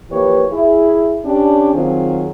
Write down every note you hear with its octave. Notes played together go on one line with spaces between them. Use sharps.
E3 F3 A#3 G4 B4 C#5
E4 G#4
C#4 D4 G4
D#3 F#3 C4 F4 G#4